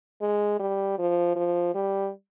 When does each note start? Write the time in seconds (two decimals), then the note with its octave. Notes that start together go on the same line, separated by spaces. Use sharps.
0.21 G#3
0.59 G3
0.98 F3
1.36 F3
1.74 G3